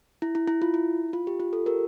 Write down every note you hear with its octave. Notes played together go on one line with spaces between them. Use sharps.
E4
E4
E4
F4
E4
F4
G4
F4
F4 A4
G4 A#4